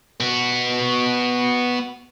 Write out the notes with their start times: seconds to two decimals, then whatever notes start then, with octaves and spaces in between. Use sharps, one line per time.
0.20 B3 F#4